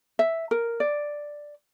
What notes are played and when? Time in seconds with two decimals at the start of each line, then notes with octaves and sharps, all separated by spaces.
0.19 E5
0.51 A#4
0.80 D5